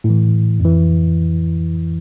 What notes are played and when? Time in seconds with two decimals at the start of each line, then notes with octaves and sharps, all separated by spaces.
0.04 A2
0.10 E3
0.60 F2 E3